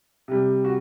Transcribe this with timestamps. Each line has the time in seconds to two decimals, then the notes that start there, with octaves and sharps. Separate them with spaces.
0.28 C3 G3
0.64 F#4